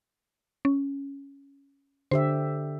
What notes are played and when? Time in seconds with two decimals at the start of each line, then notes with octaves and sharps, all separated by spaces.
0.65 C#4
2.11 D3 G4 C5 E5